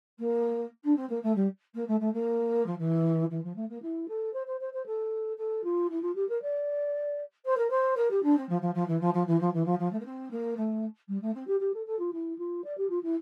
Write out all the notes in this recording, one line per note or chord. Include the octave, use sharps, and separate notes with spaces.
A#3
D4
C4
A#3
A3
G3
A#3
A3
A3
A#3
F3
E3
E3
F3
A3
A#3
E4
A4
C5
C5
C5
C5
A4
A4
F4
E4
F4
G4
A#4
D5
C5
A#4
C5
A#4
G4
D4
C4
F3
F3
F3
E3
F3
F3
E3
F3
E3
F3
F3
A3
A#3
C4
A#3
A3
G3
A3
C4
G4
G4
A4
A4
F4
E4
F4
D5
G4
F4
E4